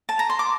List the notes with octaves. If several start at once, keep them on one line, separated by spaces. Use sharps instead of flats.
A5
A#5
C6
D6